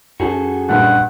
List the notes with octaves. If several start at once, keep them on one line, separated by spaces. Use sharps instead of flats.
F#2 F#4 G#4 A4
A#1 G2 F#5